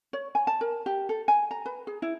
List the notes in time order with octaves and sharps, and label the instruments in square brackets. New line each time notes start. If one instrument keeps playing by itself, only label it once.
[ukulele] C#5
G#5
A5
A#4
G4
A4
G#5
A#5
B4
G#4
E4